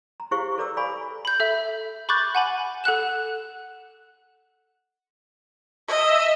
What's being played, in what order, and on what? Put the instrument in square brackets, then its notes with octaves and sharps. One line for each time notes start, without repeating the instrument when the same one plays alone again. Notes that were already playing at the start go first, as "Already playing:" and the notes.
[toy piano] A#5
E4 G4 G#4 C5 F5 C#6
A4 B4 D5 A#5 D6 E6
D5 F5 G#5 B5 C#6
[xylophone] B5 G6
A4 E5
B5 C#6 D6 F#6 G6 A6
F#5 G#5 B5
A4 F#5 F#6 E7
[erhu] D#5 [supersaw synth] E5 E6